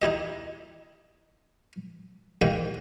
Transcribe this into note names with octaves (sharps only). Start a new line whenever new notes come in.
D#4 E4 G4 D#5
D#2 G#2 D#3 F5 G5